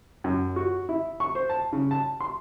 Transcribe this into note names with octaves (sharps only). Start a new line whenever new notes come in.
F#2
F#4
E4
C#6
C5
A5
C#3
A5
C6